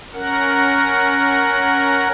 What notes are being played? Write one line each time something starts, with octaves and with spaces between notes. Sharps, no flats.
C#4 A#4 F#5